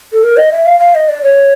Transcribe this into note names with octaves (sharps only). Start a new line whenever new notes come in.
A4
A#4
D#5
E5
F5
F5
D#5
D5
C#5